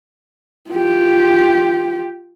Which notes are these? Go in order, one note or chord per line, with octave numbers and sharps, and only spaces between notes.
F4 G4